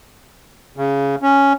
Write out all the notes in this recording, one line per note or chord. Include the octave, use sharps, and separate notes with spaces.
C#3
C#4